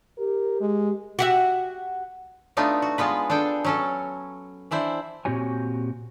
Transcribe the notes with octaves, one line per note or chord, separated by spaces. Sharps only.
G4 A#4
G#3
F#4 G4 E5
A3 B3 D4 D#4 F4
F#4
G#3 B3 F4 B4
D4 G#4 A4 G5
F#3 C#4 A4
E3 D4 E4 C5
A#2 C4 F#4 G4 C#5 G#5